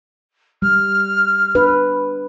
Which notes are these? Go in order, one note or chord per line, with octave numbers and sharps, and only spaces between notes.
G3 F6
D4 B4